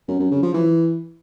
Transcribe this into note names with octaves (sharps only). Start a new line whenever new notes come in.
F#2
F#2
C#3
F3
E3